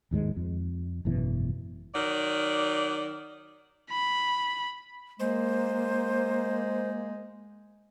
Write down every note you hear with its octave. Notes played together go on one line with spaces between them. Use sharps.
D1 D#2 G#2 G#3
F2
G#1 F#2 B2 E3
D#3 F#3 D5
B5
G#3 A#3 C5